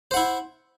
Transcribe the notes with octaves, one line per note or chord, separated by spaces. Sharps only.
E4 C5 F#5